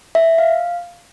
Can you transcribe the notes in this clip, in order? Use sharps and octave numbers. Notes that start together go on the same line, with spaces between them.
E5
F5